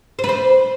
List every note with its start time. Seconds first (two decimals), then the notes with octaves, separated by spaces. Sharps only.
0.19 C5
0.24 B4
0.29 C5